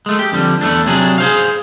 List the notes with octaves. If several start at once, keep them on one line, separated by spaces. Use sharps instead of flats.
G#3 A3
G4
F2 D3 G3
E2 A3 D4
C3 F#3 D4 G#4
G#4 C5 F5